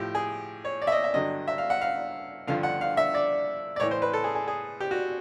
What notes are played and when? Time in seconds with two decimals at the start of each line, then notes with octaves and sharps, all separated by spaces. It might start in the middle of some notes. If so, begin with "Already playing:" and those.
Already playing: A2 F3 G4
0.15 G#4
0.65 C#5
0.82 D5
0.87 E5
0.92 D#5
1.04 E5
1.14 G2 D3 F#3 D#5
1.48 E5
1.58 F5
1.70 F#5
1.81 F5
2.47 G2 D3 F3 F5
2.63 F#5
2.81 F5
2.97 E5
3.14 D5
3.76 D5
3.80 A2 E3 C#5
3.91 C5
4.02 B4
4.13 A4
4.24 G#4
4.35 G#4
4.47 G#4
4.80 G4
4.91 F#4